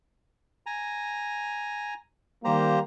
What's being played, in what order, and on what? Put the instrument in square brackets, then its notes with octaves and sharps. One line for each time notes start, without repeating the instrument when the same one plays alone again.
[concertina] G#5 A#5
[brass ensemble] D#3 G3 A#3 [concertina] G4 C5 A#5